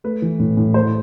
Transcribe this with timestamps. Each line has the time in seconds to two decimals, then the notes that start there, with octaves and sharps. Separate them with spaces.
0.04 A3 B4
0.22 E3
0.39 A2
0.57 A2
0.74 A3 C5